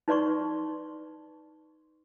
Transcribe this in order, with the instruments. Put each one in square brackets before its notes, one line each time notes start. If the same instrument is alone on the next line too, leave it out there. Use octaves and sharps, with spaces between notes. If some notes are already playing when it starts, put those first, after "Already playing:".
[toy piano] D#4 B4 D5 C6 C#6